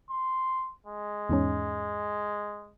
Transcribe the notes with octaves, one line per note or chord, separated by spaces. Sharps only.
C6
G#3
E2 G#2 C#4